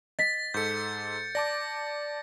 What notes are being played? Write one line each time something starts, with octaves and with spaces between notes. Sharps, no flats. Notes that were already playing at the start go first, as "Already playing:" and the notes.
D#5 A6 B6
G#2 A4 G6 C#7
D5 A5 D6 A#6